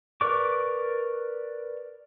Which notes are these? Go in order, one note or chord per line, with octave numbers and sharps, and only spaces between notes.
A#4 B4 D5 C#6 D6